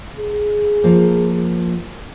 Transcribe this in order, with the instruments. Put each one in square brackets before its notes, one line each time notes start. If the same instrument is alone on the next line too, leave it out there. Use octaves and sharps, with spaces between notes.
[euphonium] G#4
[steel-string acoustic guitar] F3 A#3